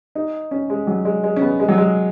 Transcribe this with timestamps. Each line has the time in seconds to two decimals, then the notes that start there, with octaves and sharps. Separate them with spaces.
0.15 D#4
0.51 C#4
0.70 G#3
0.87 F#3
1.05 G#3
1.24 G#3
1.36 C#4
1.42 B3
1.59 G#3
1.69 F#3
1.78 G#3